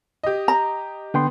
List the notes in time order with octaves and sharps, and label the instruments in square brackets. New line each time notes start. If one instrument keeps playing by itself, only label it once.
[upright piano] G4 D#5
[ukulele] A#5
[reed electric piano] D3 G5 C6 [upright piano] B3